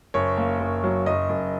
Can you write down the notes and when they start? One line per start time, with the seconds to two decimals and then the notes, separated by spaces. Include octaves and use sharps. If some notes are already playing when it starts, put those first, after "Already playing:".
0.14 F#1 C#5
0.37 A#3
0.60 F#1
0.84 F#3
1.06 F#1 D#5
1.29 F#1